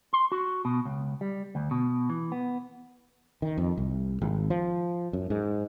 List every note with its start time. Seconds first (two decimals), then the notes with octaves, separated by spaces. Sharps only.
0.13 C6
0.32 F#4
0.65 B2
0.85 C#2
1.21 G3
1.55 D2
1.71 B2
2.10 E3
2.32 B3
3.42 D#3
3.57 F2
3.77 C2
4.22 G#1
4.50 F3
5.13 F#2
5.30 G#2